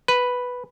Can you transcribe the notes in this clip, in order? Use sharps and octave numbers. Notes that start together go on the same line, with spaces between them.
B4